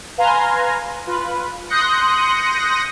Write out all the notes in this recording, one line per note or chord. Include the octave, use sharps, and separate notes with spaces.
B4 F5 G#5 A#5 C6
F4 B4
C6 D#6 F#6 G6 A#6 C#7